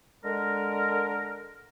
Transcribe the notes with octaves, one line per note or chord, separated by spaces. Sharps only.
D3 G#3 A#4